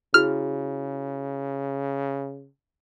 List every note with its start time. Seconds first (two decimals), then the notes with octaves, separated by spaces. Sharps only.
0.14 C#3 E4 F#4 G#4 F6